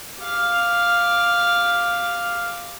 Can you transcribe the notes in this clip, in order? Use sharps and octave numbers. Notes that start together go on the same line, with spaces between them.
G4 F5